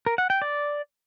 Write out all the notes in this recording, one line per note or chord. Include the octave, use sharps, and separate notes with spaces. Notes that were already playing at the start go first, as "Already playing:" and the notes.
A#4
F#5
G5
D5